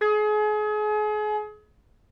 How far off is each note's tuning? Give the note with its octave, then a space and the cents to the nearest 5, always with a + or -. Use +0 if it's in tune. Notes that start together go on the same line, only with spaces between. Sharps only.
G#4 +35